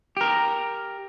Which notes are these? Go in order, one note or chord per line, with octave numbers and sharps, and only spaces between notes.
G4 A#4